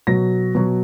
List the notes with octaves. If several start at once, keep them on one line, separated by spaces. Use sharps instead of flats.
B2 F#3 A#6
B2 F#3